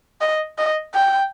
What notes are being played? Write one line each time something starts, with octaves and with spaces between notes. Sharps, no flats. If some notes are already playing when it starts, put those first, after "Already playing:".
D#5
D#5
G5